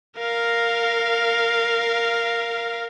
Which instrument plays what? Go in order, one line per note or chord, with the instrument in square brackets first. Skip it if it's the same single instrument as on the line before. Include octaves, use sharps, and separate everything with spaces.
[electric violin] A#4 F5